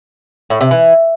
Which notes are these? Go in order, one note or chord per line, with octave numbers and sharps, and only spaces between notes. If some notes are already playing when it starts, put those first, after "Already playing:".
A2
C3
E3